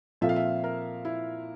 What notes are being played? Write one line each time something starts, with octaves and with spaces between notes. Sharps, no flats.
A#2 F3 C4 F4 A4 E5
F5
E5
A#4
E4